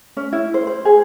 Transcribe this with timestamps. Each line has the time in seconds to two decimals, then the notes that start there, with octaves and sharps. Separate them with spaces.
0.17 C#4
0.32 E4
0.54 C5
0.67 C5
0.85 G#4